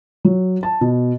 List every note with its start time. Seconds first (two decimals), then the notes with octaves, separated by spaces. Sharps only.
0.25 F#3
0.63 A5
0.81 B2